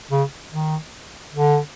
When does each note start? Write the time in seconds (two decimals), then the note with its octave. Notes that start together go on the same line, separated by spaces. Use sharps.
0.11 C#3
0.52 D#3
1.34 D3